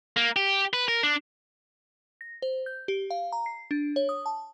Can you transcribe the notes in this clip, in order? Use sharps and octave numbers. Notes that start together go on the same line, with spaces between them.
A#3
G4
B4
A#4
D4
A#6
C5
G6
G4
F5
A#5
C7
D4
C#5
D#6
A5